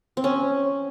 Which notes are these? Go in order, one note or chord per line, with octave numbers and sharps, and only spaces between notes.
C4
C#4